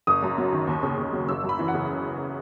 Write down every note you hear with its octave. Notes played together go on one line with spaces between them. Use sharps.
F#1 D#6
F#2
F#3
D#3
D#2
C#3
D#2
F#3
F#1 E6
F#2
B5
E3
F#5
C#3